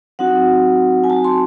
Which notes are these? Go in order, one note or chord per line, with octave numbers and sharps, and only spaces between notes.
F#3 C4 D#4 F#4 F#5
G#5
A5
C6